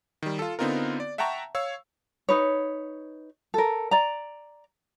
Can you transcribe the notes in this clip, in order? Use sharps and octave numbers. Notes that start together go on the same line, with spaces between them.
D#3 G3
F4 A4
D3 B3 C4 D#4 F4 A#4
D5
E5 F#5 G5 A5 A#5 C#6
C#5 F5 E6
D#4 B4 C#5
A4 A#4
D5 A#5